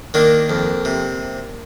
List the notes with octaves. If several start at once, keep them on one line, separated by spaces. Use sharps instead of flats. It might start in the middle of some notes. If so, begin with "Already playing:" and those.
D#3 A#3 D4
F2
C3